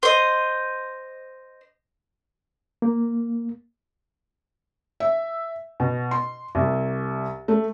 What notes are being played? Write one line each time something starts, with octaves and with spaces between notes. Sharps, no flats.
C5 D#5
A#3
E5
B2
C6
C2
A3